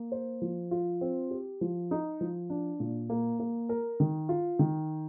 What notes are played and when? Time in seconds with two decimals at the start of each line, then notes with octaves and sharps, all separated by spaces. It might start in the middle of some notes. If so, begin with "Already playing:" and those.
Already playing: A#3
0.12 C5
0.42 F3
0.71 F4
1.01 C4
1.31 G4
1.61 F3
1.91 D#4
2.21 F3
2.50 D4
2.80 A#2
3.10 A#3
3.40 A#3
3.69 A#4
4.00 D#3
4.29 F4
4.59 D#3